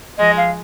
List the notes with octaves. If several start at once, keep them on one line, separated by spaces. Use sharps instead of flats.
F3 G#3 D#5
F5